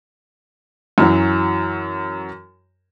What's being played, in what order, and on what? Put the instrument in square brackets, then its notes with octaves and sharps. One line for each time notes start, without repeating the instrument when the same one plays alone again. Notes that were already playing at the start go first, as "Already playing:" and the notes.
[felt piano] F#2 E3 F#3